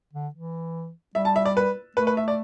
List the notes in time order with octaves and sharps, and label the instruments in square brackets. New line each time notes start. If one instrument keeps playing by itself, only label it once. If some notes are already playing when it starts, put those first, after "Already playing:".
[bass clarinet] D3
E3
[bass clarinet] G3 [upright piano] E5
[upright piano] A5
E5
D5
B4
[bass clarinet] A3 [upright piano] B4
[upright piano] B4
E5
D5